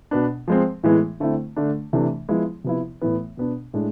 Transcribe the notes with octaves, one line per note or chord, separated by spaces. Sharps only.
B2 B3 D4
F3 G#3 C4
A2 E3 G#3 B3 E4
D3 A3 C4 E4
D3 A3 D4
C3 E3 A3 D4
F3 G#3 B3 E4
C3 F3 B3 E4
A2 E3 B3
B2 B3 D4
A2 G#3 D4